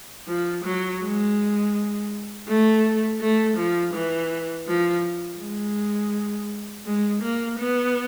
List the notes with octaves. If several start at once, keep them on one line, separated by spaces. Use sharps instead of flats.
F3
F#3
G#3
A3
A3
F3
E3
F3
G#3
G#3
A#3
B3